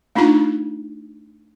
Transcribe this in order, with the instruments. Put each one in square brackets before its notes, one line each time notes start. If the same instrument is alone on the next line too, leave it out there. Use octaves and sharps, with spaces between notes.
[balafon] A3 D4 D#4 F4 A#5